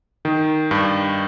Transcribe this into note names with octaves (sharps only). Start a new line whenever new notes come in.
D#3
G2